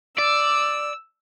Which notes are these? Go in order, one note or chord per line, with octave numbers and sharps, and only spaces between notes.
D5 E6